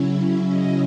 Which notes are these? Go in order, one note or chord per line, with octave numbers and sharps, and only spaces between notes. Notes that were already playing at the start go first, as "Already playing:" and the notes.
Already playing: C#3 F#3 C#4 E4
D#5